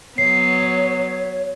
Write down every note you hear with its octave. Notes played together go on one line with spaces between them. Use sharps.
F#3 B3 C#5 C7